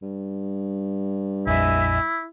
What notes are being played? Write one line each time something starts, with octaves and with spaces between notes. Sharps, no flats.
G2
A#1 F2 E4 D#5 E5 G#5